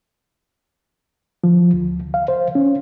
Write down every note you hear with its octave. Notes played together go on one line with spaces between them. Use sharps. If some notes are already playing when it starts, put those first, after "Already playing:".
F3
D2
F5
C5
C#4